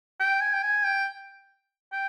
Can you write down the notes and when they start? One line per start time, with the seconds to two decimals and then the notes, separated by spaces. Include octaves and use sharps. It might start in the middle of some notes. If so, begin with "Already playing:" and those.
0.20 G5
0.41 G#5
0.53 G5
0.62 G#5
0.84 G5
1.92 G5